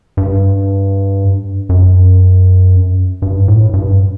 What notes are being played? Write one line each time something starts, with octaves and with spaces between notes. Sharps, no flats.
G2
F#2
G2
A2
G2